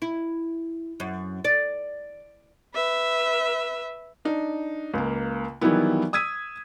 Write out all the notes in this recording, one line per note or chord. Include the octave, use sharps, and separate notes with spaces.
E4
F#2
D5
B4 E5
D4 D#4
C#2 A#3
D#3 E3 F#3 G3 B3 E4
D#6 E6 G#6 B6 D#7